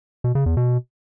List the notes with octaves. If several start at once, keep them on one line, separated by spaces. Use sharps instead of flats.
B2
C#3
E2
B2